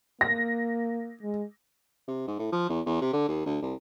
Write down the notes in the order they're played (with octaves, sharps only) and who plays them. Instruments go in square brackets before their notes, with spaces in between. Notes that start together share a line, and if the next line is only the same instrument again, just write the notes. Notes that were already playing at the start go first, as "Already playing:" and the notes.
[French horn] A#3 [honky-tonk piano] A#6
[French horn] G#3
[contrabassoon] C3
G#2
A2
F3
E2
E2
C3
D3
D#2
D2
C2